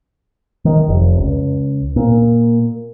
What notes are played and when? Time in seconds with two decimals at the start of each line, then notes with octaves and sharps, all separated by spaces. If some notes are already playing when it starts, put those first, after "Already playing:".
0.65 D#3
0.88 F1
1.17 C#2
1.96 A#2